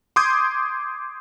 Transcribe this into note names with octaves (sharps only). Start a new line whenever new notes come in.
C6 D6 D#6 G6 G#6